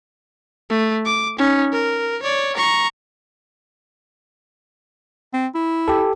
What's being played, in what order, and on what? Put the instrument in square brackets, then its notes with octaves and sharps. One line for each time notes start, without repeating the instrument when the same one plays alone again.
[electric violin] A3
D6
C#4 D#4
A#4
C#5 D5
A#5 C#6
[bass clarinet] C4
E4
[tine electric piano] G4 A4